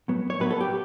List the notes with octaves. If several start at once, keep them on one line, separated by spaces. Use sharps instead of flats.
A2 F#3 B3
C#5
A2 F#3 B3 B4
A4
G4